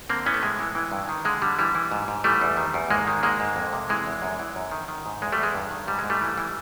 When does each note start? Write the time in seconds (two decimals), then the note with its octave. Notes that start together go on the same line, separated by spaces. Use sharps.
0.10 D3 A#3 C4
0.26 E3 B3 C#4
0.34 A3
0.42 A2 G#3
0.59 E3
0.75 E3
0.92 G2
1.09 D#3
1.25 D3 G#3
1.42 D3 G3
1.59 E3 G3
1.75 E3
1.91 G#2
2.08 G#2
2.24 E3 G3 A3
2.41 E2
2.57 D#3
2.74 E2
2.90 G#2 G#3 A#3
3.07 D#3
3.23 G#2 G#3 A#3
3.40 G#2
3.56 F2
3.73 C3
3.89 E3 G#3
4.06 E2
4.22 F#2
4.39 E3
4.56 F#2
4.72 D#3
4.88 D#3
5.06 G#2
5.22 E2 G#3
5.32 G3 A3
5.38 E2
5.43 G#3
5.54 G2
5.71 D#3
5.87 G#2 G3
5.99 G#2 G#3
6.10 G3 A3
6.21 E3
6.38 E3